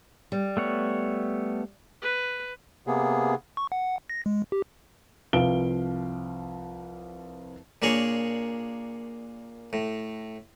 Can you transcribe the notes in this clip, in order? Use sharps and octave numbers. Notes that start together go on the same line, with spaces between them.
G3
A3 B3 C#5
B4
C3 A#3 B3 G#4
C#6
F#5
A#6
G#3
G4
C2 F3 B4 F5 D7 G7
A#2 A#3 D4 G#4 C#5
A2